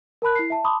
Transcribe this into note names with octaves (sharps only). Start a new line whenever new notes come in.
A#4 A5 B5 F#6
E4 C7
E5 A5
A5 B5 C6 D6 D#6